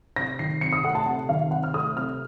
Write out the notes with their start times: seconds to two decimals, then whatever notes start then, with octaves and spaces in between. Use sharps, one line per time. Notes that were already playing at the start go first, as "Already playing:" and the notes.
0.16 C3 A#6
0.39 D#3 C7
0.61 C3 C#7
0.73 D#6
0.84 A3 F#5
0.95 A5
1.06 C3 F#5
1.29 D#3 F5
1.51 C3 F#5
1.64 F6
1.74 A3 D#6
1.96 C3 F6